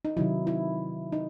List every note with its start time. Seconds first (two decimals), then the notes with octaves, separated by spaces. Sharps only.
0.05 D#4
0.17 C3 D#3 F#3 E4
0.47 E4
1.12 D#4